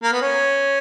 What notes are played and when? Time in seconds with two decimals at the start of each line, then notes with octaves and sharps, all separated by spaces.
0.03 A#3
0.12 B3
0.22 C#4